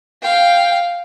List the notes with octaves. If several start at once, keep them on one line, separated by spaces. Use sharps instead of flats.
F5 G5